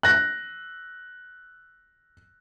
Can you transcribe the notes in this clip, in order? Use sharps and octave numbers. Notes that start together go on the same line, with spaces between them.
F#6 A#6